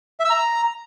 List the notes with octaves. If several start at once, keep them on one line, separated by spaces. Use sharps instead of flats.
E5
E6
A#5